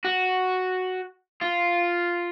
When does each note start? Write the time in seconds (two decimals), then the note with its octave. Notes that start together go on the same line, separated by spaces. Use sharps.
0.05 F#4
1.41 F4